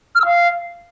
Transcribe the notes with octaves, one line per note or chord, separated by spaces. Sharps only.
F6
E6
F5